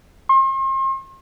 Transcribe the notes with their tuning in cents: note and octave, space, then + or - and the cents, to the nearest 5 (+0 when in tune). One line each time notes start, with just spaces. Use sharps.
C6 +40